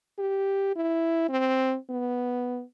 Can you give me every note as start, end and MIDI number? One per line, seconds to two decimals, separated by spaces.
0.18 0.73 67
0.76 1.27 64
1.29 1.76 60
1.90 2.63 59